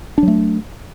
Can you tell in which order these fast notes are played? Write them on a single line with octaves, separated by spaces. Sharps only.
D4 F#3 A3